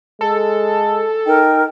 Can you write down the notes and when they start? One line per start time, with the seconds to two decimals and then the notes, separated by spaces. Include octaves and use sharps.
0.21 G#3 A4
1.27 D#4 A#4 G5